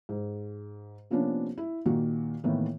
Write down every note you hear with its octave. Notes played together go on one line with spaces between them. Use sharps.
G#2
C3 F3 A#3 B3 C#4 D4
E4
A#2 D#3 A#3 F#4
A2 D#3 E3 A#3 B3